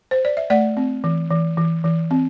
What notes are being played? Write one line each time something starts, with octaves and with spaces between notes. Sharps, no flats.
C5
D5
E5
A3 D5 F#5
C4
E3
E3
E3
E3
C4